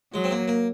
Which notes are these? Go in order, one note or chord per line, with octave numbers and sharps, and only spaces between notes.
F#3 G#3
C4
A#3
A#3